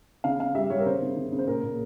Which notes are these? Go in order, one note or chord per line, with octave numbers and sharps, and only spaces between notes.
C#3 F5
C#3 F5
G3 E5
G3 C#5
A#4
C#3 C5
C#3
C#3
C#3
C5
A#2 A#4
A#2